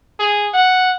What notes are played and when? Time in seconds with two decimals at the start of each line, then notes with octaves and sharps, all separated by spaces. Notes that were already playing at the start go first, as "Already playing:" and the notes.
0.19 G#4
0.54 F#5